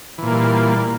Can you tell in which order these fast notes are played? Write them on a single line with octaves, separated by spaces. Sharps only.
E3 A#2 A#3 G3